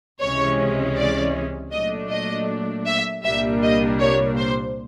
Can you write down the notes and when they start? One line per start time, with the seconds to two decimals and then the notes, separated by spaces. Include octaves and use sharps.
0.21 C#2 C3 E3 G#3 C#4 C#5
0.96 D5
1.72 A#2 F#3 A3 D4 D#5
2.10 D#5
2.86 E5
3.24 C2 A#2 G3 A#3 D4 E5
3.62 D#5
4.00 C#5
4.38 C5